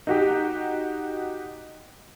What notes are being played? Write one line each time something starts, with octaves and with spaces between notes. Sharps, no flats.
D#4 F#4 G4